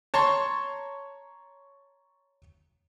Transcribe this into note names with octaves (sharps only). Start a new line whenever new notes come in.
C#5 A5 A#5 C6 C#6